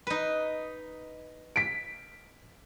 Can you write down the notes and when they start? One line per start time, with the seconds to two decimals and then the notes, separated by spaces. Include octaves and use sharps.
0.07 D#4 B4
1.56 B6 D7